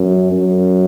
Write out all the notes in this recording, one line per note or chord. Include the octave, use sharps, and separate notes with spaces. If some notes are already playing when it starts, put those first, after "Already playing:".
Already playing: F#2
F#2